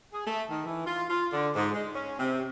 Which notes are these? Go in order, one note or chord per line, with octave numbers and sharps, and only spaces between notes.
G#4
A3
D#3
E3
F4
F4
D3
G#2
G#3
C#4
C3